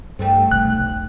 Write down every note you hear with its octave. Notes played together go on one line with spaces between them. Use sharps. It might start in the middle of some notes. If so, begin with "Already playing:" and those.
G2 G3 A3 C4
F1 B1 F#6